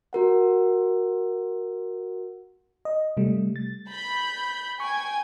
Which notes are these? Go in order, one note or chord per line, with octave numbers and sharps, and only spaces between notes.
F#4 A#4 F#5
D#5
C3 G3 A3
A6
B5 G6
G5 G#5 C#6 G#6